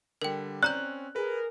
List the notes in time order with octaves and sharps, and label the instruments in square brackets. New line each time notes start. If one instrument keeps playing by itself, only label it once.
[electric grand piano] D3 G3 [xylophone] A#4 G5
[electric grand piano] C4 C#4 [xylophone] D5 A#5 G6 [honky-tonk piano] F#6
[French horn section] G#4 A#4 [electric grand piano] B4